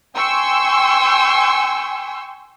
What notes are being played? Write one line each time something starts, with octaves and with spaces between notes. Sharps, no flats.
G5 G#5 C6 C#6 E6